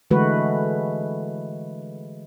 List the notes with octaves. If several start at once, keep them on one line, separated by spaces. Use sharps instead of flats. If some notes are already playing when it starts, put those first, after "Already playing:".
D3 E3 G#3 A3 F#4 B4